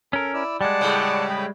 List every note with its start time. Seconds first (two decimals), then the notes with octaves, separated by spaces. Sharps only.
0.13 C#4 A4 A#4
0.33 E4 D5 E6
0.61 G3 G#3 D5 F#5 A5
0.81 A2 C#3
1.29 G5 B5